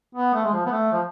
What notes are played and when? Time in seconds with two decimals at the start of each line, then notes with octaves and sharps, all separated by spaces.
0.15 B3
0.34 A3
0.45 G#3
0.53 F3
0.66 B3
0.72 A3
0.92 F3